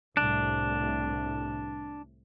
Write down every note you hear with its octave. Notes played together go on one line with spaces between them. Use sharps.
C2 A2 C3 D4